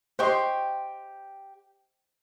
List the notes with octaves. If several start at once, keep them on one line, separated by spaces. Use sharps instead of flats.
G4 C5 D#5 G5 C6 C#6